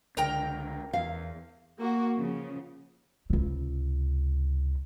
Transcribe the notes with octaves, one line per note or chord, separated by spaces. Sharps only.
C#2 D3 A#4 G5 A#5
E2 F5
A#3 F#4
C#3 F3
C#2 C3